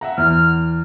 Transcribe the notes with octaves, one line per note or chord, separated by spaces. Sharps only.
E5 F#5 A#5
E2 F6